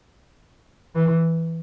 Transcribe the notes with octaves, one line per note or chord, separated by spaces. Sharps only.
E3